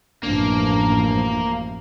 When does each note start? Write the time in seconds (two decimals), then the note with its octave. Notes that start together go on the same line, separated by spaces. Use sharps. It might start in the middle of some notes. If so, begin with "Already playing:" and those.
0.23 A1 F#2 F3 A#3 D4